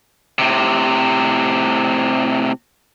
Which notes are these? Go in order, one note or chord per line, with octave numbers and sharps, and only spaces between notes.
A2 C3